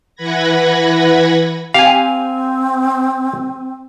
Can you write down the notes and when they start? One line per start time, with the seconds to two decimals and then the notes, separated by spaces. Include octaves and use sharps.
0.16 E3 B4 F#5 B5 G#6 A#6
1.74 C4 G4 F5 G#5